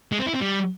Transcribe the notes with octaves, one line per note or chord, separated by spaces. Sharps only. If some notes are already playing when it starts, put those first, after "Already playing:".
G#3
C4
E4
C4
G3